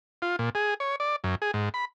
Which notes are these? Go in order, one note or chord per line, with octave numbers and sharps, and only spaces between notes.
F4
A#2
G#4
C#5
D5
F#2
G#4
G#2
B5